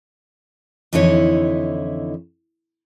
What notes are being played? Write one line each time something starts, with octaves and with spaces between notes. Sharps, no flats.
F2 D3 E3 D#4 E4 C#5